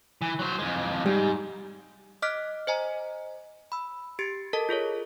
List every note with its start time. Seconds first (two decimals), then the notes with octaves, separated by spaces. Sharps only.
0.22 E3
0.39 F#3 C5
0.59 F2 G#3
1.06 G#2 G3
2.22 D#5 D6 F6 F#6 B6 D7
2.67 C5 D#5 G#5 A#5
3.72 B5 E6
4.19 G4 A6 C7 D7
4.53 A4 A#4 D#5 A5
4.69 F4 G#4 A#4 C#5